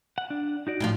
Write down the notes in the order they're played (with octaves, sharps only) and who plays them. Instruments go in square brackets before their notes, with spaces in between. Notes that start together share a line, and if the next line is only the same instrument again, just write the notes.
[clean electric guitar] F#5
D4
D#4 F#4 D5
[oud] A2 D#3 F3